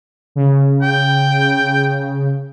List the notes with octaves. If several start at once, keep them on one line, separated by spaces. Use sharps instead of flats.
C#3
G5